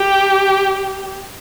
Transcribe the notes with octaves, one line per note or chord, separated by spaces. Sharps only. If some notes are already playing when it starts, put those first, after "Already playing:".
Already playing: G4